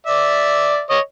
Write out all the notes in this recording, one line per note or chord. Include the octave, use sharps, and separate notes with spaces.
D5 E5
C#5 D#5